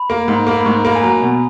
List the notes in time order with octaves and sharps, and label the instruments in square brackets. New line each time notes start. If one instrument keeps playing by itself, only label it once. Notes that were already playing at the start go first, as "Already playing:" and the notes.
Already playing: [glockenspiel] B5
[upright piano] A#3
G#2
[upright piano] A#3 [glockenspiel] B5
[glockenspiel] B5
[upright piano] G#2 [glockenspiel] C#6
[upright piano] A#3 [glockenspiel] B5
[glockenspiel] G#5
[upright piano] F#3 [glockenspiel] A#5
[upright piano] B2